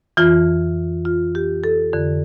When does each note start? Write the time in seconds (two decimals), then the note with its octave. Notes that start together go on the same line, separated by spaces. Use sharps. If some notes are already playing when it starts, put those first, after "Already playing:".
0.17 F2 E3 F4
1.05 F4
1.35 G4
1.64 A4
1.93 F2 D3